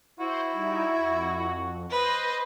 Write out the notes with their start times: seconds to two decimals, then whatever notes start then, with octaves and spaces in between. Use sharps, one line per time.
0.20 E4 F#4 C5
0.53 G3 D#4
0.95 F2
1.90 B4 C5 D#5